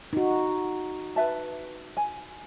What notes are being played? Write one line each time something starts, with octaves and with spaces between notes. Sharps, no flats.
D#4 F#4
B4 E5 A5
G#5